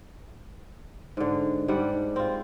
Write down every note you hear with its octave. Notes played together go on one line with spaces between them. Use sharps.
G#2 D3
G#2 G3 D4 F#5
C4 F4